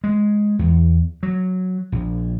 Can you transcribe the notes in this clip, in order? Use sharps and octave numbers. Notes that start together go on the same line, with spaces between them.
G#3
E2
F#3
A#1